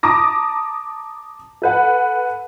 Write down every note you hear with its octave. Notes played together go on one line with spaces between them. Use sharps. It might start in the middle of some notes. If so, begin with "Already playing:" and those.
A5 A#5 D6 D#6 A#6
A4 B4 F#5